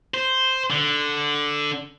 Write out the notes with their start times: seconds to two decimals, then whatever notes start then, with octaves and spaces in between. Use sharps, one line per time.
0.14 C5
0.71 D3